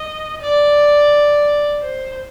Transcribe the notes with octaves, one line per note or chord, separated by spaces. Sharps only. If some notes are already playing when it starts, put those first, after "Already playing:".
Already playing: D#5
D5
C5